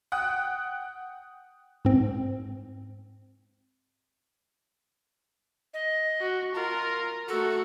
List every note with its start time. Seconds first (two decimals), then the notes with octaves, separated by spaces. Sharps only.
0.12 F#5 G5 D#6 F#6
1.85 G#2 C4
5.74 D#5
6.21 F#4
6.55 F4 A#4
7.28 A3 F#4 A4